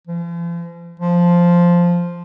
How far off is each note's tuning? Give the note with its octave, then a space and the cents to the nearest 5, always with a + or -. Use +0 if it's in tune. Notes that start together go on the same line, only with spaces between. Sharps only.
F3 -45
F3 +0